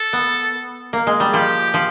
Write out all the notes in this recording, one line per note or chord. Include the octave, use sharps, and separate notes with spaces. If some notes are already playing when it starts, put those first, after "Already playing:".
Already playing: A4
B3
A#3
G#3
G3
F3 G4
F3